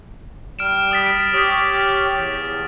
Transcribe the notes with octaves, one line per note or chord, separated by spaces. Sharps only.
G3 F6 D7 E7
D#6 A6 B6
D7
G4 C#5 D#6 F6 B6
E2